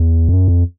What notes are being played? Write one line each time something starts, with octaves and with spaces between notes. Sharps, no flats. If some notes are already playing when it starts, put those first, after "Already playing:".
Already playing: E2
F2
F#2
F2